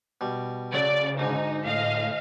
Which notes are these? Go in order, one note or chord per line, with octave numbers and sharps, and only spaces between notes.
B2 G3
C#3 F#3 A3 D5
D2 G#2 D3 D#4
A2 D#5 F5